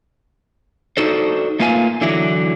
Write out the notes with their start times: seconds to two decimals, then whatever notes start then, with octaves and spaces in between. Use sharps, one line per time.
0.97 D4 D#4 F#4 A4 C5
1.60 A3 A#3 F4 B4 F5 G#5
2.01 D3 E3 F#3 E4